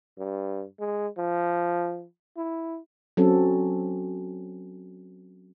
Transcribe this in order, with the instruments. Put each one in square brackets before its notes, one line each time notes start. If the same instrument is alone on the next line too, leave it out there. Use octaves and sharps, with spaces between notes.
[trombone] G2
G#3
F3
E4
[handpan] F#3 C4 C#4 A4